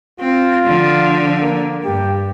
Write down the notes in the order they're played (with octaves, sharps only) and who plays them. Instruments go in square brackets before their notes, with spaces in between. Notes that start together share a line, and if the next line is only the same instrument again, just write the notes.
[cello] C4 [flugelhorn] F4
[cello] D3 F3
[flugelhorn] A#3
[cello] G2 [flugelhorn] G4